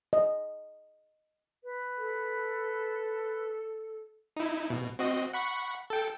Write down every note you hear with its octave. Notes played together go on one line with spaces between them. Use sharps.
D#5
B4
A4
D#4 E4
B2
C4 F#4 D#5
F#5 B5 C#6
A4 G5